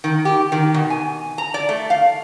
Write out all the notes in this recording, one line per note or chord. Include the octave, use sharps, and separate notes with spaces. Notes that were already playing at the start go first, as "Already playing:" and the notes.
D#3
G4
D#3
B2
G#5
A#5
D5
A3
F5